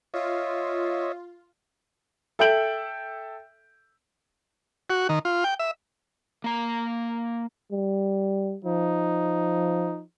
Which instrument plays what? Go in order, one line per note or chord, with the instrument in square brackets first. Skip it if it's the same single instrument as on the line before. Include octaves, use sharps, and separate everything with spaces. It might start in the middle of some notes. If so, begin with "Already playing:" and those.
[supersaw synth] F4 [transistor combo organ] C#5 D#5 E5
[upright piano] A4 E5 G5 G6 D7 F#7
[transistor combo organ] F#4
D#3
F4
G5
E5
[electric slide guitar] A#3 A#5
[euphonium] G3
[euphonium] F3 [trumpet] D#4